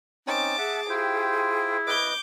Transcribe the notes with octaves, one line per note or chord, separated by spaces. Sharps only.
C4 C#4 D#4 A5 D6
G#4 E5 F#5
E4 F4 G4 C5 G5
B4 D#5 D6 G6